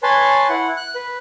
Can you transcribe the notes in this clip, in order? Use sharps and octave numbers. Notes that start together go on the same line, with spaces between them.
B4 C#5 G#5 A5 C6
E4 F#5
F#6
B4